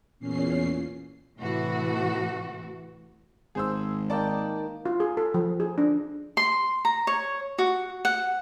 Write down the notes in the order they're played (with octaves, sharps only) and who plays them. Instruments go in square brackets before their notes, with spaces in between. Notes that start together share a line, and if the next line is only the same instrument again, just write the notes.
[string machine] E2 A#2 C#4 C7
[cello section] A2 C3 E3 F#4
[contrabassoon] G#1 [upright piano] G#4 C5 E6
[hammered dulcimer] D#3 A#3 G5 [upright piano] D5 A5
[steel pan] F4
G#4
A4
F3
G#4
D4
[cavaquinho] C6
A#5
C#5
F#4
F#5